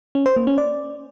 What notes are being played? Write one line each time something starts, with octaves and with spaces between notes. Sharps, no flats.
C#4
C5
A#3
C#4
D5